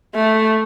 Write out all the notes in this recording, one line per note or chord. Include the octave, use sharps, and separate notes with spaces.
A3